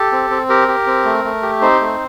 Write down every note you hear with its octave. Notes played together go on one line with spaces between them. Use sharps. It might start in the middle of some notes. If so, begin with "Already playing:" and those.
Already playing: G4 A4
C4
C4
G4 A#4
G4
C4
A3
A3
G4
C4 D#4 C5
A3